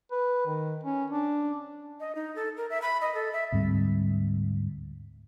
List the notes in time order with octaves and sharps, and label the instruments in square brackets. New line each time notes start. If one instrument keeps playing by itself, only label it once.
[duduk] B4
D#3
C#4
D4
[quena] D#5
D#4
A4
A#4
E5
B5
D#5
A4
E5
[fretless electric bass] D2 G#2 G3 C4